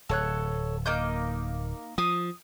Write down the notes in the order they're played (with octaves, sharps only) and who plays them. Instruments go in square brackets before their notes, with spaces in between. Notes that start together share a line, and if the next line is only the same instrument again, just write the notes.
[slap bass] D1 [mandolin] A4 C#5 F#6
[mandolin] A#3 D#4 G6
[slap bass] F3 [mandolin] D#6